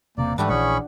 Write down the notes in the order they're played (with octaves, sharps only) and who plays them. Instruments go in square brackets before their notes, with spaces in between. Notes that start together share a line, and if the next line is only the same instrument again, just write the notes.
[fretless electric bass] E1 C3 [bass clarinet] A#3 [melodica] D5
[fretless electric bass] G#2 [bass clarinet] E3 [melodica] G3 A3 B4 [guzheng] D4 F#4 G4
[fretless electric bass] A#1 E3 [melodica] C#4 B5 C#6 [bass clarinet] G#4